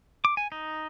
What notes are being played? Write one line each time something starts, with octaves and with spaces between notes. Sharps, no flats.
D6
G#5
D#4